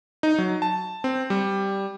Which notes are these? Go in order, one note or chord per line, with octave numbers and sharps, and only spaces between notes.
D#4
F#3
A5
C4
G3